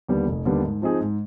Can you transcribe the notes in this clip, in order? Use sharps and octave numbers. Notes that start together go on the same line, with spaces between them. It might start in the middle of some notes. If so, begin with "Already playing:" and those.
D#2 D3 G3 B3
F1
D#2 D3 G3 B3
G#2
F3 C4 D#4 G#4
G#2